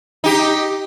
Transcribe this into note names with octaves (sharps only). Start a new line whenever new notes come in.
D#4 G4